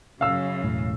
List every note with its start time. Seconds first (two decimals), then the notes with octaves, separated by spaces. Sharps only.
0.21 F#2 C#3 F5 E6
0.64 E1 A2